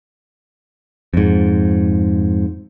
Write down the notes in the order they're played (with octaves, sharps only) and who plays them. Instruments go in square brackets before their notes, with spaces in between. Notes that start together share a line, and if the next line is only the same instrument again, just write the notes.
[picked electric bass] F2 G#2